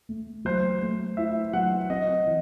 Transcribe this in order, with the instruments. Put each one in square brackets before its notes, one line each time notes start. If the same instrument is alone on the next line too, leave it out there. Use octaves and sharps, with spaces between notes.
[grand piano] A3
[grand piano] F#3 [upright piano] C5
[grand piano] A3
[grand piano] E4 [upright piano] E5
[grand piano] F#3 [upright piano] F#5
[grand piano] C4 [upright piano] D#5
[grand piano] E3